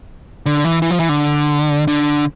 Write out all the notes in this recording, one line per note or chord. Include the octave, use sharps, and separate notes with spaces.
D3
E3
E3
F3
E3
D3
D3